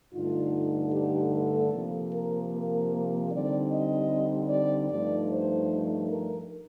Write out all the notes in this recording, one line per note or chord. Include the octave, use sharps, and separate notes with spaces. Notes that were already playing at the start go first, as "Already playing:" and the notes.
G2 D3 A3 D#4 F4
G4
A4
C3 F3 A#3
A#4
A#4
D3 G3 C4 D#4 D5
D#5
D5
G2 F3 A3 D#4 D5
C5
A#4